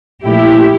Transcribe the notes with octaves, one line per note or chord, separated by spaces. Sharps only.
A#2 F3 A3 E4 G4